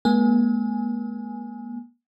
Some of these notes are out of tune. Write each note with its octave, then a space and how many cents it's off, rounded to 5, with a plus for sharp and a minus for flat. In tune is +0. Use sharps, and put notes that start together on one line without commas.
G#3 +45 B3 -45 G#5 +0